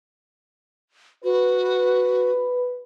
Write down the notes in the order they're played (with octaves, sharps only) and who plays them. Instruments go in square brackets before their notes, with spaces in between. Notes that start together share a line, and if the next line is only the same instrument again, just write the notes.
[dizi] F#4 [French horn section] B4